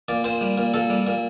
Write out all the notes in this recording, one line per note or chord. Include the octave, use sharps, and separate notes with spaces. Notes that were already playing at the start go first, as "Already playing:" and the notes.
A#2 D5
A#2 C5
G3
A#2
A#2 A4
G3
A#2